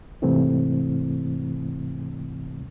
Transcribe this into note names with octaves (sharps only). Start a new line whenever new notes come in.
G#2 C3 E3 A3 C4 E4